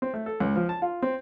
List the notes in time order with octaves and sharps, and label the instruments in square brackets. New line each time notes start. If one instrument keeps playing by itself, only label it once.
[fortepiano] C4
A3
A4
C#2
F3
A5
F4
C4